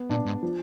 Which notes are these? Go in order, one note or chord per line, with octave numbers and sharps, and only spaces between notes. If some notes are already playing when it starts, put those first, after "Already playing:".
Already playing: B3
A#2 D4
G#2
F3